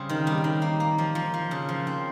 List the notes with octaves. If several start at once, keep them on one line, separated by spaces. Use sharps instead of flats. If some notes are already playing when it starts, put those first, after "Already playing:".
Already playing: C#3 G3 C4
D#3
G3
D#3
A#3
A#3
F3
F3
F3
C#3
F3
C4